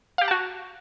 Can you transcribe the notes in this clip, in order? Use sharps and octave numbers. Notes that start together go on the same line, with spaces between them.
F#4 G4 F5 F#5 A5